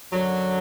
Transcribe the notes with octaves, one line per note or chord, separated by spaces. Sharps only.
F#2 D3 F#3